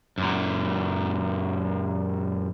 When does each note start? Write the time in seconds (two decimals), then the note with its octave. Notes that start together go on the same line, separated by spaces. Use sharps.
0.18 F#2 A#2